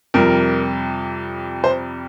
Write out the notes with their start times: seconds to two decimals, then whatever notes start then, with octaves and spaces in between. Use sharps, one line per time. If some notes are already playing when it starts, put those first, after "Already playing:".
0.14 F2 C3 G3 A#4
1.64 C5